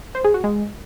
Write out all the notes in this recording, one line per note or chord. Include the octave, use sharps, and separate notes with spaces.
C5
G#4
F#4
G#3